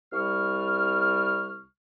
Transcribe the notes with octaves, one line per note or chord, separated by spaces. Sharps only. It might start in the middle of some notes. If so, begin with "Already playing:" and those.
C2 G3 C#6 F6